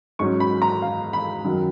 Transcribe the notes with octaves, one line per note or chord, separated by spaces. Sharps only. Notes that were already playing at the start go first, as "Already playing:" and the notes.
G#2 F#3 C#4 C#6
B5
A#5
F5
B5
F#2 D#3 F#3